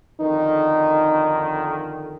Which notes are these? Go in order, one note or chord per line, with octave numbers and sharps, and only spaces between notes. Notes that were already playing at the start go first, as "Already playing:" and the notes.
F2 D3 D#3 D#4